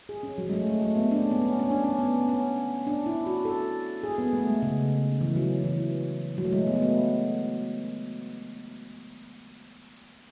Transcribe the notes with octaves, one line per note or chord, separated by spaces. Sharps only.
G#4
C#4
F#3
G#3
A3
A3
A3
B3
D4
C#4
B3
C#4
C#4
D4
C#4
B3
B3
C#4
D4
E4
F#4
A4
G#4
B3
A3
G#3
C#3
E3
F#3
E3
F#3
A3
G#3
B3
A3
B3